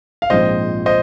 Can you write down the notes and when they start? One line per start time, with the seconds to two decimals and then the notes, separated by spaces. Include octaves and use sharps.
0.22 F5
0.30 A#1 G#2 F3 C4 C5 D#5
0.86 C5 D#5